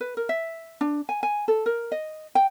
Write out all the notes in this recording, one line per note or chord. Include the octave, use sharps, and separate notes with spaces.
B4
A#4
E5
D4
G#5
G#5
A4
A#4
D#5
G5